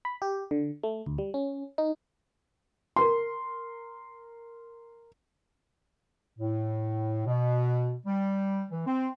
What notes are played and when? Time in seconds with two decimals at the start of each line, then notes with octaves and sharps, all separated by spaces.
0.05 B5
0.22 G4
0.51 D3
0.83 A3
1.06 D2
1.18 G3
1.34 C#4
1.78 D#4
2.96 A#4 C6
6.39 A2
7.26 B2
8.05 G3
8.70 E3
8.87 C4